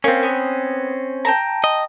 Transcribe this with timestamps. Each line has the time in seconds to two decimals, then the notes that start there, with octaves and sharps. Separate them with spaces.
0.04 A#3 C4 C#4
0.23 B3
1.25 G5 A5 A#5
1.64 D#5